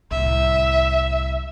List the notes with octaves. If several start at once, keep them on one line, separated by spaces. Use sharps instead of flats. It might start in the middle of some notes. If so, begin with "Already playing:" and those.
C2 A2 E5